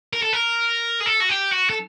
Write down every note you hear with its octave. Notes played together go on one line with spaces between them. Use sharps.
A#4
A4
A#4
G#4
A4
F#4
G4
F#4
A4